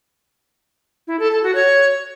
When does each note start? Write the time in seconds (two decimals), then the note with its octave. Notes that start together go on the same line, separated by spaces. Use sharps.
1.07 E4
1.19 A4
1.31 A4
1.43 F#4
1.55 C#5